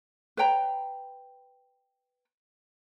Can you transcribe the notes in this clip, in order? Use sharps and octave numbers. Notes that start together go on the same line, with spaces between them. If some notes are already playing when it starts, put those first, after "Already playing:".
B4 C#5 G5 A#5